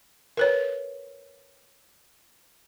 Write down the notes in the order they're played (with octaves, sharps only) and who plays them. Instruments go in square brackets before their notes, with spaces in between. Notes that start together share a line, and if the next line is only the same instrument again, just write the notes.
[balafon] A#4 B4 C#5